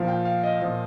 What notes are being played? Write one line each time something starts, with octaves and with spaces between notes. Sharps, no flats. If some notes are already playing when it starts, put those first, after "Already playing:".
Already playing: A#2 F3 F5
G5
F5
D#5
A#2 F3 D#5